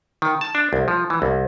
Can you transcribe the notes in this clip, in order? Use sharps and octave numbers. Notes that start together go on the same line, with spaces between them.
D#3
A5
D4
C2
F3
E3
C2